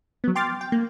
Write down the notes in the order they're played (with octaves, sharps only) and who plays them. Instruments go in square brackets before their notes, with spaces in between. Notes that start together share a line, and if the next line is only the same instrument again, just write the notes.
[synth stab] F#3 B3
G5 C6 D6 F6 A6
G5
A#3